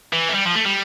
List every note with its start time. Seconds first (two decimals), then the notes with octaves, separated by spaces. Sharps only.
0.13 E3
0.29 A3
0.34 G3
0.45 F3
0.55 A3
0.66 G3